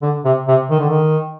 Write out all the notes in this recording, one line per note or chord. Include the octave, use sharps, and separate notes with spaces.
D3
C3
C3
D#3
D3
D#3